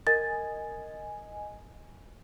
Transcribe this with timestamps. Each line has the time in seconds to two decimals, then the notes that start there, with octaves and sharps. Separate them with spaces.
0.07 A#4 D#5 G#5 A6